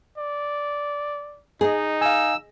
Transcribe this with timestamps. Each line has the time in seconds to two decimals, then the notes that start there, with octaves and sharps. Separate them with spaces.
0.17 D5
1.61 D#4 G#4 D#5
2.01 F5 G#5 E6